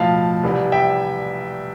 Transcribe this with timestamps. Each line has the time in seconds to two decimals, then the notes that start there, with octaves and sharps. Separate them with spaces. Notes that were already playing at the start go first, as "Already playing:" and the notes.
Already playing: B1 A2 F3 F5 A5
0.43 C2 C3 E3 G3
0.72 E5 G5